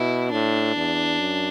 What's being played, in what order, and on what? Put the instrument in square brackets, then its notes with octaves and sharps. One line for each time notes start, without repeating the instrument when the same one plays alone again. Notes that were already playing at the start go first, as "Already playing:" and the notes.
Already playing: [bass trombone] B2 [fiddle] E4
[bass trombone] A2 [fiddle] D4
[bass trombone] E2
F#2